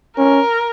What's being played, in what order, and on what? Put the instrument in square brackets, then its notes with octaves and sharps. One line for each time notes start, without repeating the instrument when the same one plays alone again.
[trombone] C#4 [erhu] A#4